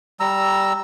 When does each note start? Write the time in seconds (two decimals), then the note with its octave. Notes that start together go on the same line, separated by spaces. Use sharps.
0.20 G3 A#5 E6